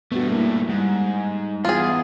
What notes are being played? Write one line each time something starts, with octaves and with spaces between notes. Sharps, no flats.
G2 A3 B3 F#4
A#3 E4
G#2 G3
E2 F4 G#4